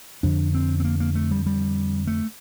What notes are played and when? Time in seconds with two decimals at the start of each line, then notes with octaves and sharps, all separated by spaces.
0.23 F2 D3 D4
0.54 C4
0.80 C4
0.84 A#3
1.00 A#3
1.15 A3
1.31 G3
1.46 G3
2.07 A3